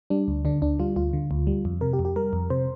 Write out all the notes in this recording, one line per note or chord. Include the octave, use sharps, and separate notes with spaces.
G3 D4
D2
D3 D4
D2 D4
G3 F4
D2 F4
D3
D2
G3
F2
C3 A#4
G4
F2
G4
G3 A#4
F2
C3 C5